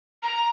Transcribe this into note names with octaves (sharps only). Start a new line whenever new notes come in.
A#5